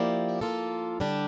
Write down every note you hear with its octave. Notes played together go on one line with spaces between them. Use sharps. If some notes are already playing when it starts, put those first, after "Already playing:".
Already playing: F3 A#3 E4 G4 D5
F3 A#3 F4 A4
D3 G3 D4 G4